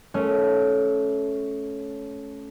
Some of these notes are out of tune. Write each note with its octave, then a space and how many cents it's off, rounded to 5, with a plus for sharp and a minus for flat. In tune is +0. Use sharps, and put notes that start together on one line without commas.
A3 -20 C#4 +0